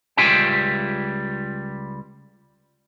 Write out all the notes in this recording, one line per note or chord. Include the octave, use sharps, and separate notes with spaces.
C#2 G3 F4 E5 G5 G#5